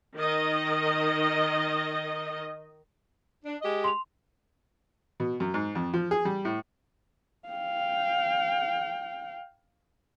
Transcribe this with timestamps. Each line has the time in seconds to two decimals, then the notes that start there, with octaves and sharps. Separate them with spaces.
0.16 D#3 D#5
3.45 D4
3.62 G#3 G4 D#5
3.84 C6 F7
5.20 B2
5.40 F#2
5.54 G#2
5.75 F2
5.93 F3
6.11 G#4
6.25 G3
6.45 A2
7.48 F5 G5